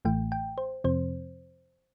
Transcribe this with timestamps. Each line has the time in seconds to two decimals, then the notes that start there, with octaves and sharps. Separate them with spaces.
0.05 A1 A2 E3 A3 G5
0.32 G5
0.58 C5
0.84 F2 C3 F3 C4 C5